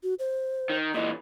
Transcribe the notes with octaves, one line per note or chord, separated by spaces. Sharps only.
F#4
C5
D#3
A#2 E3 D#5